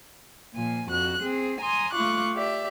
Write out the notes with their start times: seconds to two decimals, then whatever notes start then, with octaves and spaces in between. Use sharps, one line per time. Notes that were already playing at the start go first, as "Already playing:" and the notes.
0.53 A#2 F3 G#5
0.88 F2 F#4 F#6
1.21 C4 G#4
1.61 G#5 A#5 C6 D#6
1.92 A3 F4 C#6 D6 F#6
2.33 G4 D5 E5